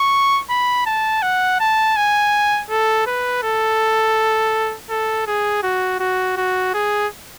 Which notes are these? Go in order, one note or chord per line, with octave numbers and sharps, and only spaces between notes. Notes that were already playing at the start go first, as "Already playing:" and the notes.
Already playing: C#6
B5
A5
F#5
A5
G#5
A4
B4
A4
A4
G#4
F#4
F#4
F#4
G#4